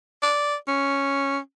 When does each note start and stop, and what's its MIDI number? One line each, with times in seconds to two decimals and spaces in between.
0.22 0.55 74
0.68 1.38 61